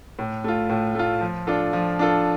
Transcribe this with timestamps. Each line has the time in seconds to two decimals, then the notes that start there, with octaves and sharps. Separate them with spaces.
0.19 A2
0.44 A3 F4
0.69 A2
0.95 A3 F4
1.21 F3
1.47 D4 F4 A4
1.73 F3
1.99 D4 F4 A4